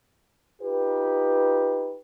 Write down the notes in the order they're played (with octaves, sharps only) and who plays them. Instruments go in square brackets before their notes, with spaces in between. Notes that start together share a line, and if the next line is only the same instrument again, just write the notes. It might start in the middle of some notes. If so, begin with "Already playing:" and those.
[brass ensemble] D#4 F4 G4 B4